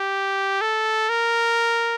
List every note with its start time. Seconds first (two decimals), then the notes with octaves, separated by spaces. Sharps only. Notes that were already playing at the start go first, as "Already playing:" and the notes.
Already playing: G4
0.61 A4
1.09 A#4